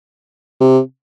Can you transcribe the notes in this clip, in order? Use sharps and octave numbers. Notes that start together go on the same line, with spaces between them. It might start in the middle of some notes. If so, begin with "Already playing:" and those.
C3